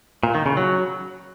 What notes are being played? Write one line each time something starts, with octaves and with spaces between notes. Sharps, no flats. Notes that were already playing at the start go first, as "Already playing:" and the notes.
A#2
D#3
C#3
F#3